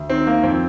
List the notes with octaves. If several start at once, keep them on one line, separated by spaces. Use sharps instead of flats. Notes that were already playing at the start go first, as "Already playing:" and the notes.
Already playing: D2
D#3 C4
A#3
F2 C4